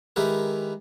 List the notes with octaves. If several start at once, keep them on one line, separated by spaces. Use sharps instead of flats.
D#3 G#3 E4 G4 A#4 B4